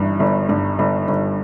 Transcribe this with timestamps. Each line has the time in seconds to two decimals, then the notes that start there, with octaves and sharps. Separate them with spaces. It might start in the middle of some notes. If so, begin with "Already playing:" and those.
Already playing: G1 G2 E3
0.20 G1
0.49 G2
0.79 G1
1.08 G1